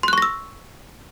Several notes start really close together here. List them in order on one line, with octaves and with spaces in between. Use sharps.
C6 F#6 C#6 A#6 E6